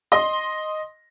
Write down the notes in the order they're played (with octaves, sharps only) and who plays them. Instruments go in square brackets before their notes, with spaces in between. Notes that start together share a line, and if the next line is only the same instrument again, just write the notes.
[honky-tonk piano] D#5 C6